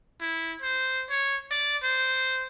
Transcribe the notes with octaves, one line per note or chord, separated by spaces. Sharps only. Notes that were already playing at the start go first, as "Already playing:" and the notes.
E4
C5
C#5
D5
C5